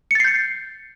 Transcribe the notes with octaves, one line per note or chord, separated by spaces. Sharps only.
G6 A6 C7 C#7